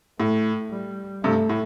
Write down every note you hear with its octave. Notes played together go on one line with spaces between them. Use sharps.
A2 A3
G3
G2 C3 A3
A2